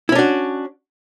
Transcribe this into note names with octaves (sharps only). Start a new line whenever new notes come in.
C#4 D4 E4 F#4